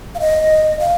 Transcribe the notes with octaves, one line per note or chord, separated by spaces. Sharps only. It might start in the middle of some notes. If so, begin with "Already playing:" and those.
F5
D#5
F5